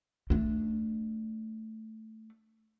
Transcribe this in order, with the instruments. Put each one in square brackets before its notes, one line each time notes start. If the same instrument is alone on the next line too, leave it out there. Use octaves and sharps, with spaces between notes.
[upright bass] A3 D4